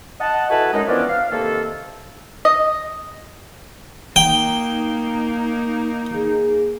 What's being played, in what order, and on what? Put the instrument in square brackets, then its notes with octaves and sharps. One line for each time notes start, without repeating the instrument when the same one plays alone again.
[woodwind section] D#5 F#5 A5
E4 F#4 A4 B4 G#5 A5
F#2 G#3 D#4
E3 F3 B3 C#4 D4
F5
C3 D#3 A#3 A4
[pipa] D#5
[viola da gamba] A#3 [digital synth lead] D#4 [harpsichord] G5
[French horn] G#4